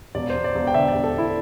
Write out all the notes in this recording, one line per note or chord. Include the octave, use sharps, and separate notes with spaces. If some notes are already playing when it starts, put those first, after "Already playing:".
E1 D5
E1 C5
D5
E1
G5
D3 E5
D5
E1
A4
E1 E4